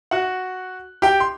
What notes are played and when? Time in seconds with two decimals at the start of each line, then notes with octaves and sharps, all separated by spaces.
0.11 F#4 F#5
1.02 G4 G5
1.20 C6